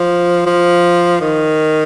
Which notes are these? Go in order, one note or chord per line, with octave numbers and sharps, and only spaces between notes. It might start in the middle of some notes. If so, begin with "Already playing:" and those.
Already playing: F3
F3
D#3